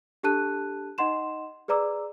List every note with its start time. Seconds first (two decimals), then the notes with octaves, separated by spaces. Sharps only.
0.23 D4 G4 A4 A5 F#6 D#7
0.98 D#4 D#5 F#5 C6 E7
1.68 G#4 B4 D5 A#5 D6 E6